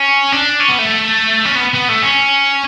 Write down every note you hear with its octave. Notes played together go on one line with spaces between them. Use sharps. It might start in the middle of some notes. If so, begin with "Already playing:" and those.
Already playing: C#4
D4
C#4
B3
A3
C#4
B3
B3
A3
C#4